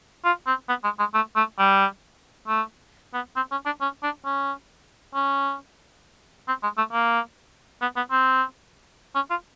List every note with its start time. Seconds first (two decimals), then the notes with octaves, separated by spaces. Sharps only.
0.25 F4
0.47 C4
0.69 B3
0.84 G#3
0.99 G#3
1.14 A3
1.36 A3
1.59 G3
2.48 A3
3.13 B3
3.36 C4
3.51 C#4
3.65 D4
3.81 C#4
4.03 D4
4.25 C#4
5.14 C#4
6.48 C4
6.63 G#3
6.77 A3
6.93 A#3
7.81 B3
7.96 B3
8.11 C4
9.15 C#4
9.30 F4